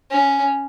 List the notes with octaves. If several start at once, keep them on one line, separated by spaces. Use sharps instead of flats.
C#4